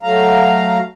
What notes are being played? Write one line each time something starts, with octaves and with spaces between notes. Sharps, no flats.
F#3 A3 F5 A#5